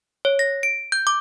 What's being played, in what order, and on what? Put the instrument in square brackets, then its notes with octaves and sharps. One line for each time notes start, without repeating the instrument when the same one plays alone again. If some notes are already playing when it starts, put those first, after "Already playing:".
[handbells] C#5
A#6
D7
G6
D6